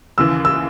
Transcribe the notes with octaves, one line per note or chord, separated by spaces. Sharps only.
D#2 C#3 E3 E6
E6